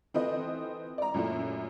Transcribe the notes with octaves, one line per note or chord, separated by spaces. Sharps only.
E3 C4 F4 A4 B4 D#5
D5 A#5
F#2 A#2 A3 E4